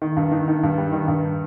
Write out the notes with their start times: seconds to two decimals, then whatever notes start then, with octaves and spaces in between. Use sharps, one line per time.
0.02 D#3
0.16 G2
0.31 D#3
0.48 D#3
0.63 G2
0.77 G3
0.92 D#3
1.08 G2